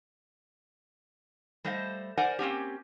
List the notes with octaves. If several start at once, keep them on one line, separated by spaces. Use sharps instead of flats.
G3 A3 C5 D#5 F5
A#4 C5 D5 F#5 G#5
A#3 C4 C#4 G4